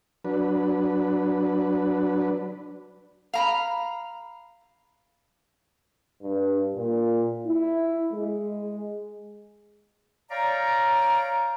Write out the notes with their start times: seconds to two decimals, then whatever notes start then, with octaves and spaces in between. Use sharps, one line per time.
0.25 F#3 D4 B4
3.34 F5 A#5 B5
6.22 G2
6.76 A#2
7.47 E4
8.13 G#3
10.30 C#5 D5 F5 G5 A#5